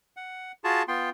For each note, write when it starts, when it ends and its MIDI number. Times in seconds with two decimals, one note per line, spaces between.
0.17 0.52 78
0.64 0.83 65
0.64 0.83 66
0.64 0.83 68
0.64 0.83 81
0.88 1.10 59
0.88 1.10 65
0.88 1.10 79
0.88 1.10 84